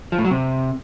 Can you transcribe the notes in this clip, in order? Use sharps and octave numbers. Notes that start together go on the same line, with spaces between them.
F3
A2
F#3
C3